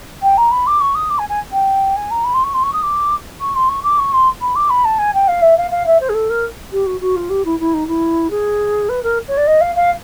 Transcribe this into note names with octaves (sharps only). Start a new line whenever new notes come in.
G5
A#5
B5
D6
C#6
D#6
D6
G#5
G#5
G5
G#5
A#5
B5
C6
C#6
C6
C#6
D#6
D6
C#6
C6
C#6
D6
C#6
C6
B5
D6
B5
A5
G#5
G5
F5
E5
F5
F5
E5
C5
G#4
A4
A#4
G4
F#4
F#4
F4
G4
E4
E4
D#4
E4
G#4
B4
A#4
C#5
D5
D#5
F5
F5